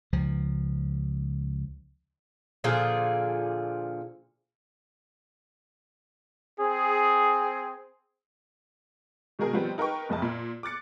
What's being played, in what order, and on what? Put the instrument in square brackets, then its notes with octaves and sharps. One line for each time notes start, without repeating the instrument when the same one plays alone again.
[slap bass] C#2 F3
[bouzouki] A#2 D3 F3 G#4
[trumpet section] C4 G#4
[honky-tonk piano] B2 D#3 G#3 G#4 A#4
D#3 F3 G3 B3 C4
D#4 A#4 B4 G5 C#6
F#1 F2 D#5 A5
A#2
D6 F#6 A6 C#7